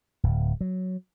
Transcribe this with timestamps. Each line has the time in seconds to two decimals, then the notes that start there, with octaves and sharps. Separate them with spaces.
0.23 D1
0.61 F#3